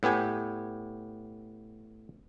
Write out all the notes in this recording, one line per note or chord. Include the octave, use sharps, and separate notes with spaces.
A2 B3 G4 G#5